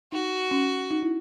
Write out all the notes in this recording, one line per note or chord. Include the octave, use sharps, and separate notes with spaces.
D#4 F#4
C#4
D#4
E4